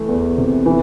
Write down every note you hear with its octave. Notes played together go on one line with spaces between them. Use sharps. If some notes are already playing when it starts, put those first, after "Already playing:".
Already playing: E3 A3
E2
C3
E3